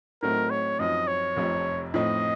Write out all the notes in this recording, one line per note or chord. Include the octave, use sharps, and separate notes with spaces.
A2 F#3 A3 C4 D#4 A#4
C#5
F#2 F3 C4 D#4 D#5
C#5
F1 F2 C3 F3
A2 F3 C4 D#4 D#5